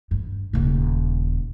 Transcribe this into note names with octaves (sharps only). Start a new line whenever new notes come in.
G2
D#1 C#3